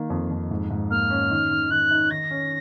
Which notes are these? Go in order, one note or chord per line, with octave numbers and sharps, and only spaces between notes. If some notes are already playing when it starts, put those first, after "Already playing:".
Already playing: D#3 A#3
F2
F2
G#2
G#2
A#3 F6
C#4
D#3
D#3
D#3 F#6
D#4
D#3 A#6
C#4